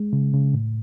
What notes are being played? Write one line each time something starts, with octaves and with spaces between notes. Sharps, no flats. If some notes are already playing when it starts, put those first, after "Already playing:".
Already playing: G#3
C#3
C#3
A2